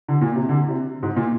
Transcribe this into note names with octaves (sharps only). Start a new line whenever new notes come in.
D3
A#2
C3
D3
C3
G#2
A#2